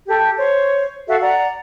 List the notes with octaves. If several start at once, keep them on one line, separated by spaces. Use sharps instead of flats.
G4 A4
C5 C#5
F#4 A4 E5 F5
D5 F#5 A#5